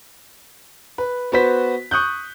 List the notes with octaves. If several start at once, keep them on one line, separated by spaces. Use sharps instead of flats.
B4
B3 F#4 B4 C5 B6
C#6 D#6 F#6 G6